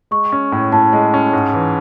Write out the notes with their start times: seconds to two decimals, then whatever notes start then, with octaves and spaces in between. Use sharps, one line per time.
0.11 G#3 C#6
0.32 C#4
0.52 A2
0.72 A2 A5
0.93 G#3
1.14 C#4
1.33 G#2
1.54 E3